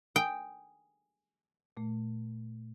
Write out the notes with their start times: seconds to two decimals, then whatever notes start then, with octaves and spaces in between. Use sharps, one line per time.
0.16 G5 G#5 D#6
1.77 A#2 A3